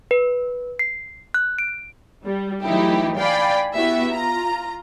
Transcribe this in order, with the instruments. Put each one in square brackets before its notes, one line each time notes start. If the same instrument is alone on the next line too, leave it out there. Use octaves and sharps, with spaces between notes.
[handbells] B4
C7
F#6
D7
[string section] G3
E3 F#3 A3 D#4 E4 G4
D5 F5 G5 G#5 B5
B3 E4 F#4 G4 E5
F4 A#5